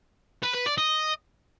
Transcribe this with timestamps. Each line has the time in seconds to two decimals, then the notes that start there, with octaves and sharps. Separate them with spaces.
0.43 B4
0.55 B4
0.66 D5
0.78 D#5